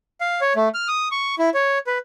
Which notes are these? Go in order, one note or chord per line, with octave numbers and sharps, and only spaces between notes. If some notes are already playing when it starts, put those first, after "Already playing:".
F5
C#5
A3
F6
D#6
C#6
E4
C#5
B4